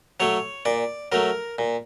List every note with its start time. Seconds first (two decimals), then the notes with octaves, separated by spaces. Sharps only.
0.20 F#3 A3 C#5
0.65 A#2 D5
1.12 F#3 A3 A#4
1.58 A#2